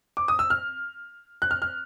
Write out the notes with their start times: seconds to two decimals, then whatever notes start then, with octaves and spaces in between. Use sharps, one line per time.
0.17 D6
0.28 D#6
0.39 E6
0.50 F6
1.42 F#6
1.51 F6
1.62 F6